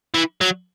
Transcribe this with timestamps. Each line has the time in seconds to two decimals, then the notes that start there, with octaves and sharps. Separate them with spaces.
0.14 E3
0.41 F#3